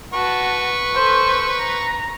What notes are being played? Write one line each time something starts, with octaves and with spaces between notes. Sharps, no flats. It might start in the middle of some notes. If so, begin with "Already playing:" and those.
F#4 B4 A5 C#6
A4 C5
A#5